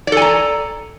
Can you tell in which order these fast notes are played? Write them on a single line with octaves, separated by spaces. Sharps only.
D5 A4 G#5 A#5